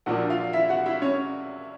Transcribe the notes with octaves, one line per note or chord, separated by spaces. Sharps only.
A#1 A#2 F3 A#3 D4 F#4 F#5
F4 F5
E4 E5
F#4 F#5
E4 E5
C#4 C#5